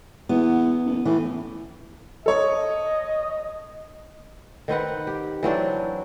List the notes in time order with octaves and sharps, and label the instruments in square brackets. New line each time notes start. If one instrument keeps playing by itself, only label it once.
[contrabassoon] E2 [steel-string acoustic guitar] B3
[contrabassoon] F#1
[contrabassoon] A2 [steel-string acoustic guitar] E3
[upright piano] A4 C#5 [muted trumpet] D#5
[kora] D#3 C4 B4 F#5
G4
E3 F#3 C4 D4